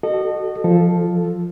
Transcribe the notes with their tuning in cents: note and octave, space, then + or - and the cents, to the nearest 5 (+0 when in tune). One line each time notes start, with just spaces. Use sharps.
F#4 +30 A4 +0 D#5 -30
F3 +0 A4 +0